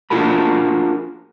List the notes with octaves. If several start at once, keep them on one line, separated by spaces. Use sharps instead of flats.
D4 F4 F#4 G#4 A#4 B5